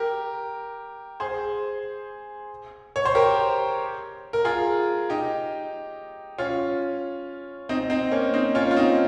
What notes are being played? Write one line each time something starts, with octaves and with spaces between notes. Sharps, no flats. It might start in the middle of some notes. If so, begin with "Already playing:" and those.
Already playing: G4 A#4
G#4 C5
C#5
C5
G4 A#4
A#4
F4 G#4
D#4 G4
C#4 F4
C4 D#4
C4 D#4
A#3 C#4
C4 D#4
C#4 F4
F4
C4 D#4